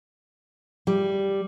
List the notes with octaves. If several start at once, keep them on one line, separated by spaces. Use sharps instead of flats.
G3